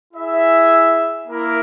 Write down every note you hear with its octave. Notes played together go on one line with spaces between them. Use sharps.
E4 G#4 E5
A#3 E4 A#4